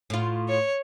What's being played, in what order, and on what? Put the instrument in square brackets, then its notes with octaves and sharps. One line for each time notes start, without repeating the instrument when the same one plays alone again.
[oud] A2 F4
[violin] C#5